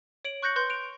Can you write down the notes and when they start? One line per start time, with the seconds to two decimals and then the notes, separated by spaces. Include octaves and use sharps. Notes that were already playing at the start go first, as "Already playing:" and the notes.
0.25 C#5 D7 F#7
0.42 C#6 F#6 G6 A#6 C#7 F#7
0.56 B4 C6 G6
0.70 D7 F7